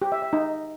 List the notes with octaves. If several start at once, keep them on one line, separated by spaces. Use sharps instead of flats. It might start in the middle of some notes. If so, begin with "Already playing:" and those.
G4
E5
E5
D#4